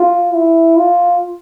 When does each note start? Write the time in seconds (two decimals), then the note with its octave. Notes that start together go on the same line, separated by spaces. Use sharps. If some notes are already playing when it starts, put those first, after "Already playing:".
Already playing: F4
0.34 E4
0.77 F4